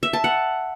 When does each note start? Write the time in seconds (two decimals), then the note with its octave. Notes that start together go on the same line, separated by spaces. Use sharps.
0.03 E5
0.13 A5
0.24 F#5